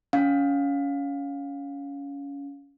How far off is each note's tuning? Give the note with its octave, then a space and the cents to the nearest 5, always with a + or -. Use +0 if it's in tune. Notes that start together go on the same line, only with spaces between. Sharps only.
C#4 +20 F5 +20